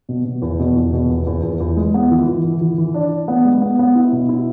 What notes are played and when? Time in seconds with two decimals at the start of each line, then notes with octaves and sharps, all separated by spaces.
0.09 B2
0.25 B2
0.42 E2
0.59 B2
0.76 E2
0.93 B2
1.10 E2
1.27 E2
1.43 E2
1.60 E2
1.77 G#3
1.94 B3
2.11 E3
2.28 E3
2.44 E3
2.61 E3
2.78 E3
2.94 D4
3.12 D4
3.28 B3
3.45 G#3
3.62 B3
3.79 B3
3.95 E4
4.13 B2
4.29 E4